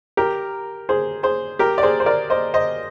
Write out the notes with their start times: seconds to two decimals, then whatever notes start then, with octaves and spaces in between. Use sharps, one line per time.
0.17 G4 A#4
0.89 G#4 C5
1.23 G#4 C5
1.59 G4 A#4
1.78 D5
1.83 G#4 C5
2.00 C5
2.06 A#4 D5
2.30 C5 D#5
2.54 C5 D#5